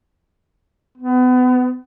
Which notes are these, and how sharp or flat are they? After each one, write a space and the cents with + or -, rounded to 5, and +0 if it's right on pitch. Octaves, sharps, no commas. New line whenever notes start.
B3 +30